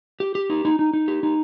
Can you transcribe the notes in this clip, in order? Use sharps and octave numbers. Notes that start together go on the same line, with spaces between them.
G4
G4
D#4
D#4
D#4
D#4
G4
D#4